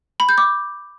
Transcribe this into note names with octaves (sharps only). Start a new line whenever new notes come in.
B5
G6
D6